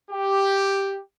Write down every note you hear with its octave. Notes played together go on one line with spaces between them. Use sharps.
G4